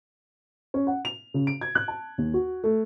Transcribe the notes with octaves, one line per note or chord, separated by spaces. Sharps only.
C#4
F#5
F7
C#3
D7
G#6
F#6
A5
D#2
F#4
A3